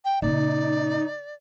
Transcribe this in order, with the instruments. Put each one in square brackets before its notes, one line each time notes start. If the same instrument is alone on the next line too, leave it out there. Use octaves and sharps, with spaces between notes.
[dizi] G5
[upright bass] A#2 C#3 [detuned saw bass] D#4 [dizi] D5